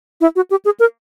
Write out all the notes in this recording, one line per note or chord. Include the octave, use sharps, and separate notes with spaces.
E4
F#4
G4
G#4
A#4